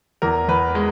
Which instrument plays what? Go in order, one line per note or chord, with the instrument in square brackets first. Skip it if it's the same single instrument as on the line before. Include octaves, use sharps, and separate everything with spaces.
[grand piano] E2 A#4
E2 B4
G#3